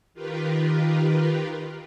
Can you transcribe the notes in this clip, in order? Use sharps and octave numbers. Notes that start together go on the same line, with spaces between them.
D#3 F4 G4 A#4 B4